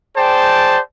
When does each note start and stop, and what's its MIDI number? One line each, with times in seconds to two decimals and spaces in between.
0.17 0.79 68
0.17 0.79 72
0.17 0.79 74
0.17 0.79 79
0.17 0.79 81